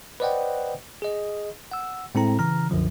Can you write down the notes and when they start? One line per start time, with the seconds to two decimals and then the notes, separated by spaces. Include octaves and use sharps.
0.20 B4 C5 D5 D#5 F#5 G5
1.02 G#4 D#5
1.71 F#5 E6
2.15 A2 G#3 C4 E4 A4 A#5
2.39 C#3 E3 A#5 F6
2.70 C2 F#2 D3 F3 F#3